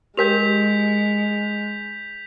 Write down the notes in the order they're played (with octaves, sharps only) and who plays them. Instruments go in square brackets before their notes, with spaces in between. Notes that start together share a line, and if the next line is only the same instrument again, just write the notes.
[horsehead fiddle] G#3 [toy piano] G4 A#4 G5 [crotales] G6 B6 F7